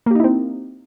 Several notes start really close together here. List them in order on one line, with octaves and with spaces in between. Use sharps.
A#3 G4 D#4 E4 C4